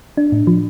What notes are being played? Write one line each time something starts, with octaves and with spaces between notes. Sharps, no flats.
D4
A2
F3